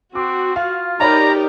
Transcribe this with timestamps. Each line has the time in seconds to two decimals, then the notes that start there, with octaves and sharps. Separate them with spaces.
0.15 C4 F#4 D6
0.56 F4 F5
1.00 D#4 G4 A#4 C#5 D5 A#5 B5